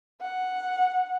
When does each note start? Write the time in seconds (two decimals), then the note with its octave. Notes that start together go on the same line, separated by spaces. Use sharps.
0.21 F#5